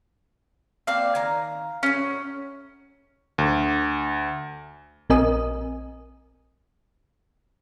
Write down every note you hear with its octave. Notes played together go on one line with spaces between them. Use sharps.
A#3 C4 D4 F5
D#3 G#5 A#5
A2 F#3 C#4
D2
A#1 C4 A#4 D#5 G#5 D#6